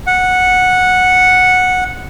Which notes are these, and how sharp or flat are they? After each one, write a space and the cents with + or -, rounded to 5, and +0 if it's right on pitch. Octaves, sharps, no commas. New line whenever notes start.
F#5 -10